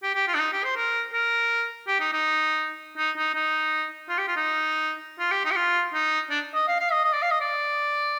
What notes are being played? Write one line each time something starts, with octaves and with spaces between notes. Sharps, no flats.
G4
G4
F4
D4
D#4
G4
C5
A#4
A#4
G4
D#4
D#4
D#4
D#4
D#4
F4
G4
F4
D#4
F4
G4
D#4
G4
F4
D#4
D4
D#5
F5
F5
D#5
D#5
D5
F5
D#5
D5